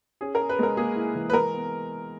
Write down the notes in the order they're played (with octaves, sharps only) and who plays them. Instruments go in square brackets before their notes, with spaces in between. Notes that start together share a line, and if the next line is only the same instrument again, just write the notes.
[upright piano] C#4 [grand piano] G#4
[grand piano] A#4
[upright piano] G#4
[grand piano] B4
[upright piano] G#3 [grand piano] A#4
[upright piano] A#3 [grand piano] G#4
[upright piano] E4
E3
[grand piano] B4
[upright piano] G#3 [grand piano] A#4
[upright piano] B3